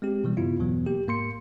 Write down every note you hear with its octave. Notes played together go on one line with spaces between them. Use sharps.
G#3 C4 G4
B2 E3 G3
G2 C#3 B3 E4 F4
E2 B2 E3 F#3 B3
A#3 G4
G#2 A#3 C6 C#7